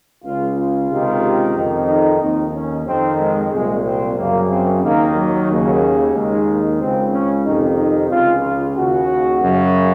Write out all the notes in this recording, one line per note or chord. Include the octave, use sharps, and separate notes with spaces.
C#2 C#3 F4
F4
C#2 C3 D#3
F2 D#3
D#4
D#2 D#3 D#4
C#4
F2 D#3 C4
G#3
C2 A#2 G#3
C4
F#2 C#3 A#3
C4
D#2 D#3 A#3
F#3
D#2 C#3
D#2 D#3 G#3
C#2 C#3 C4
C#4
F2 C3 D#3 D#4
D#4
C#2 C#3 F4
F4
D#2 C#3 F#4
F#2 C#3